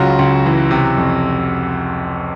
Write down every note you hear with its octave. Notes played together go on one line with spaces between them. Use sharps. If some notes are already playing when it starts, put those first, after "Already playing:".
Already playing: C#2 C#3 F#3 F4 F#4
C#2
E3
C3
F2